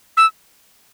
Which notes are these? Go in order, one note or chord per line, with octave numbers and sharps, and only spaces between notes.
E6